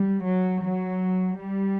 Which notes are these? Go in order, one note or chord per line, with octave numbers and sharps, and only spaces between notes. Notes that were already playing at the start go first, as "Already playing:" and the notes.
Already playing: G3
F#3
F#3
G3